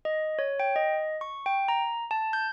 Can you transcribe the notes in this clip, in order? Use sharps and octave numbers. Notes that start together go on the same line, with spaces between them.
D#5
C#5
G5
D#5
C#6
G5
A#5
A5
G6